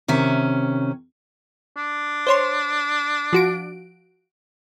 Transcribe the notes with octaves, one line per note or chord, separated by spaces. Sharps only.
C3 D#3 C#4 E5
D4
C5 C#5 C6
F3 F#4 D7